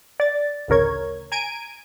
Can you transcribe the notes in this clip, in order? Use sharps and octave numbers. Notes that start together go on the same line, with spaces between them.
D5 A6
A1 D2 C#3 A#4 C#5 G#6
G#5 A#5 G#6 D7 D#7